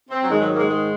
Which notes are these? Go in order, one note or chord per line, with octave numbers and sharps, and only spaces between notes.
C4
F#3
G#2 D#3 G#3
F#3
F#3 A#3
G#3
G#3